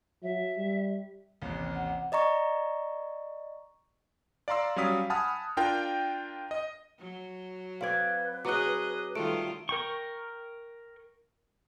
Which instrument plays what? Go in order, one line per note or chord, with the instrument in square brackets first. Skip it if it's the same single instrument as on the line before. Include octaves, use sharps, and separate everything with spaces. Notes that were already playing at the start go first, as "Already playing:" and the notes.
[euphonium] F#3 [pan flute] E5
[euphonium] G3
[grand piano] A1 D#2 C3
[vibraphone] F#5
[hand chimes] D5 D#5 A#5 C#6
[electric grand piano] D5 F5 A#5 C6 E6
F#3 G3 C#4 F5 D#6 B6
F#5 G#5 A5 B5 D#6 F6
D4 F4 A#4 G5
D#5
[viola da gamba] F#3
[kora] C4 D5 [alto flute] B4 [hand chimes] F5 G#6
[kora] F#3 [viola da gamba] G#4 D#5 [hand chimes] D6 F#6
[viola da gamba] D#3 G3 F4 [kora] A3 [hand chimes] D7
[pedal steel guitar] A#4 G5 C#6